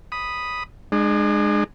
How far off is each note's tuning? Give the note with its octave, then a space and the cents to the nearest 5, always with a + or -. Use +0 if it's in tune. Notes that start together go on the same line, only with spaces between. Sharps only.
B5 +0 D#6 +0
G#3 +0 D4 +40